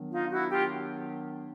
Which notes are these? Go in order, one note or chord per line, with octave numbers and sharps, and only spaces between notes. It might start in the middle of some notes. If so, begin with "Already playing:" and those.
Already playing: D#3 F#3 B3 D4
D#4 F4
E4 F#4
F4 G4